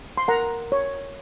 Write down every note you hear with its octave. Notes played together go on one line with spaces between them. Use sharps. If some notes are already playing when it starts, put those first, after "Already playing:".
C6
A#4 F#5 A#5
C#5